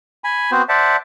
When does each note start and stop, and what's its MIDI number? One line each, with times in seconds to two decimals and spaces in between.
0.24 0.51 80
0.24 0.51 83
0.52 0.62 59
0.52 0.62 60
0.52 0.62 66
0.52 0.62 72
0.69 0.97 72
0.69 0.97 74
0.69 0.97 76
0.69 0.97 78
0.69 0.97 81